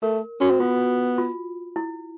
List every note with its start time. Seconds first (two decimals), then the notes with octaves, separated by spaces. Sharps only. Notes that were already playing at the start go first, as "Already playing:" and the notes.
0.02 A3 A#4
0.41 C#4 F#4
0.51 C4
0.60 B3 F4
1.18 F4
1.76 E4